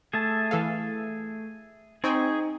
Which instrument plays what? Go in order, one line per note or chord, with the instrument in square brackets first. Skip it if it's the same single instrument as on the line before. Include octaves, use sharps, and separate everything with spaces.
[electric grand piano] A3 [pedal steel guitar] G#4 E5 A5
[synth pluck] E3 A4 F5
[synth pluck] C4 G5 G#5 [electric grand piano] D#4 C#6 [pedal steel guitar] G#4